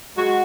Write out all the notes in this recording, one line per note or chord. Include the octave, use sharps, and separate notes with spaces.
G#3 F#4